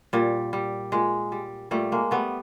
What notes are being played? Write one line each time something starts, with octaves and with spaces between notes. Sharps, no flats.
A#2 G3
G3
A#2 G#3
G3
A#2 G3 A3
G#3 A#3
G3 A3 B3